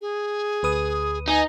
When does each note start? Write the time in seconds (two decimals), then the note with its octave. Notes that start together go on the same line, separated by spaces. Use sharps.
0.02 G#4
0.63 D2 B4 D#6
1.28 D#4 G#5